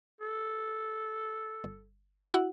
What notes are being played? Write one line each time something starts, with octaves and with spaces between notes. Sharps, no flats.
A4
G1
E4 F#4 F#5